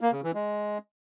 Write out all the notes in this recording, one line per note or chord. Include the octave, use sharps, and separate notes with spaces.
A#3
C#3
E3
G#3